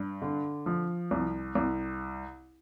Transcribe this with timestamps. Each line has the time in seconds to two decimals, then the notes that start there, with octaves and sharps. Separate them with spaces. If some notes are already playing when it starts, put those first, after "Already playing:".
Already playing: G2
0.22 D3
0.66 F3
1.11 C2
1.55 C2